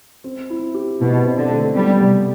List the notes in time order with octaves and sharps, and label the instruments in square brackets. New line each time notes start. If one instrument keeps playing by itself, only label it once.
[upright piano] C4
E4
G4
[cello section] B2 [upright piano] E4
[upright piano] C4
[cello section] D3
[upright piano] A3
[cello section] G3 [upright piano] B3
[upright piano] C3